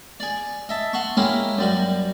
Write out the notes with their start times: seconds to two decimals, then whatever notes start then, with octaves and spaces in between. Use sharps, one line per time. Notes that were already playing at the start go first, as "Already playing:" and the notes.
0.20 G#4 D5
0.69 D#5 E5 A5
0.93 F#5 A5 C6 C#6
1.17 G#3 A#3 C#4 E4 G4
1.58 F#2 G3 F#4